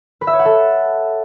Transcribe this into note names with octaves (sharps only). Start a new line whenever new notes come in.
B4
E5
C#5
F#5
A4